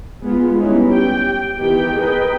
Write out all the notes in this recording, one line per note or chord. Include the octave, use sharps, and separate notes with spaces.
G#3 B3 F4
G3 B3 C#4 D#4 E4
G4 G5
D#3 E3 B3 G4 G5
G#4 A#4 B4 D#5 G5